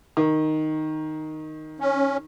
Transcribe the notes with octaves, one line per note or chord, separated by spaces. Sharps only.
D#3
C#4